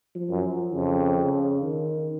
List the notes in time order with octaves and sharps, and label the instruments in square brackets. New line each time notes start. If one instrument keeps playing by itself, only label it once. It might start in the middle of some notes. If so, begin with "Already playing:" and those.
[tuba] F3
[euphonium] F#2
[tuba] F3
[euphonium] F2 [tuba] C#3
[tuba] C#3
D#3